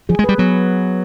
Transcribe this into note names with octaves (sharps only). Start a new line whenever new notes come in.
F3 G#4
G#3
G3 B4
F#3 B3